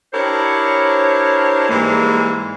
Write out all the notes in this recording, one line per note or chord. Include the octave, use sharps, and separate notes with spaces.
D4 E4 G4 A#4 C5 C#5
G#2 E3 G3 G#3 A#3